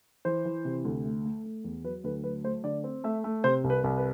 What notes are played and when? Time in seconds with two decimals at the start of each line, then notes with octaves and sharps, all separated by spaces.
0.25 E3 C5
0.45 E3
0.65 C3
0.85 D2
1.05 A3
1.25 A3
1.44 A3
1.64 E2
1.84 F#3 B4
2.04 D2 B4
2.24 F#3 B4
2.44 A3 C5
2.64 D3 D5
2.84 C4
3.04 A3 E5
3.24 A3
3.44 C3 C5
3.64 C2
3.70 B4
3.84 C2
3.97 B4